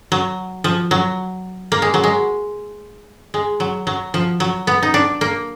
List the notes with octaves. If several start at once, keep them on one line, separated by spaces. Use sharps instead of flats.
F#3
F3
F#3
A#3
G#3
F#3
G#3
G#3
F#3
F#3
F3
F#3
B3
D#4
D4
A#3